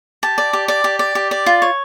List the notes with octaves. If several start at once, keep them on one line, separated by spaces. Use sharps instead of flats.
G4 A5
D5
G4
D5
G4
D5
G4
D5
F4
C#5